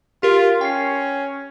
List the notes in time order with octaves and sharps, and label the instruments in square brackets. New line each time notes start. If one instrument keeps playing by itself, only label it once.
[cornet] F4 [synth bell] G4 A#4
[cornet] C#4 [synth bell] G5 C7